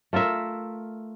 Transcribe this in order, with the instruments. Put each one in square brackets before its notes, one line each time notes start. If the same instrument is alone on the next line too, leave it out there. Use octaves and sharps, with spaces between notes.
[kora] A3 F4 A#4 E5